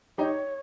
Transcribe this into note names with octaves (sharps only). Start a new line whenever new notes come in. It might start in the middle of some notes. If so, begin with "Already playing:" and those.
D#4 G4 C#5